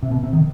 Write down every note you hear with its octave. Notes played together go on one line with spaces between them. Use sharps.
C3
B2
C3
D#3